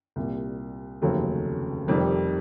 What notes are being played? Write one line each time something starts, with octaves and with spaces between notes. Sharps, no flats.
C2 A#2 G3
F1 D#2 C#3 F#3 A3
F1 F2 C3 D#3 G3